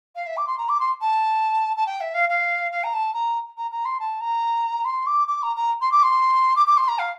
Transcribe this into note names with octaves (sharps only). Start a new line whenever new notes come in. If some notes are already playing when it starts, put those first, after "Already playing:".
F5
E5
D6
C6
A#5
D6
C6
A5
A5
G5
E5
F5
F5
F5
A#5
A5
A#5
A#5
A#5
C6
A5
A#5
C6
D6
D6
A#5
A#5
C6
D6
C6
D6
D6
C6
A#5
F5